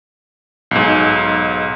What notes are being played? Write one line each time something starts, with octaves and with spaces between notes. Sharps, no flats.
B1 G#2